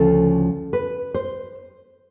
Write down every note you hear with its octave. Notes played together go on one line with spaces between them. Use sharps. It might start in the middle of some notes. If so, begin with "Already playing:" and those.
Already playing: D2 C#3 F3 A4
B4
C5